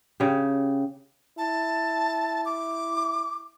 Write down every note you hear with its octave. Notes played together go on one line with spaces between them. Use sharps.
C#3 G4
E4 A5
D6